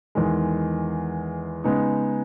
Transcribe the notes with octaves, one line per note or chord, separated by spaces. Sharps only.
E2 D#3 G#3
C#3 G#3 B3 D#4